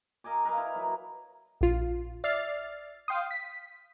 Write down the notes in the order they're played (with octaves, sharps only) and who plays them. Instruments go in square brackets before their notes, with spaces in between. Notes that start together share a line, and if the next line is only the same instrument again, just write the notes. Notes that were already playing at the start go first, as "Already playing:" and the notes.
[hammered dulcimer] A#4 D#5 G#5 D6
A#4 B4 D#5 F5
E4
F#3 A#4 B4 E5
[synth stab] A#1 F4
D5 E5 F6 A6 C7
F5 G5 C6 D#6
B6